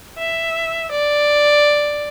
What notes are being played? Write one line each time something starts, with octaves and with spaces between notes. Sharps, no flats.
E5
D5